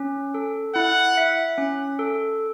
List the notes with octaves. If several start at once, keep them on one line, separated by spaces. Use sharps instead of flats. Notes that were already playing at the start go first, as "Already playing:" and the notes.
Already playing: C#4
A4
E4 F#5
E5
C#4
A4